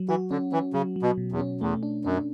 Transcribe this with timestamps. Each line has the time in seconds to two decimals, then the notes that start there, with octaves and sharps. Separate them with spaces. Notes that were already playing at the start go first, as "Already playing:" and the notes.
Already playing: F#3
0.09 E3 F#4
0.31 D3 C#4
0.52 E3 C#4
0.73 C#3 F#3
0.96 F#3
1.02 B2
1.18 B2
1.32 E2
1.39 C#4
1.61 E2 A3
1.83 D4
2.05 F#2 D4